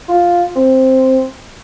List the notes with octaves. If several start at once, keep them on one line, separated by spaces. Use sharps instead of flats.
F4
C4